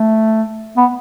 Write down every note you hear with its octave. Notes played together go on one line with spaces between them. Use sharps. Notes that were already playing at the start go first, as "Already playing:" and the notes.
Already playing: A3
B3